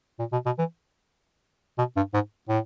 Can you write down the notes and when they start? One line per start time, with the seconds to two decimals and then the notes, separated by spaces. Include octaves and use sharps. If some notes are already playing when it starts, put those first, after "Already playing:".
0.19 A#2
0.32 B2
0.46 B2
0.59 E3
1.78 B2
1.96 G2
2.14 G#2
2.49 A2